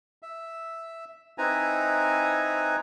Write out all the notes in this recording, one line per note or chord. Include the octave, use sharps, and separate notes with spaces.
E5
C4 D#4 E4 B4 G#5 A#5